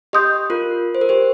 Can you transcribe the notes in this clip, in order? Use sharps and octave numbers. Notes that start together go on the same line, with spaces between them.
G4 D#5 C6 D#6 G6
F4 A#4
C5
A#4
G4 C5